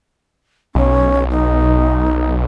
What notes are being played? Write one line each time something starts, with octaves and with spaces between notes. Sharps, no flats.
B1 C#4
D#4